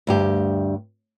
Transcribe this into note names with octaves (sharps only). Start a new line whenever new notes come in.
D2 G2 G4